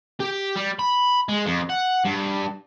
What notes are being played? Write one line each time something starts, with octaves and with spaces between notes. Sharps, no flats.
G4
G3
B5
G#3
F2
F#5
G2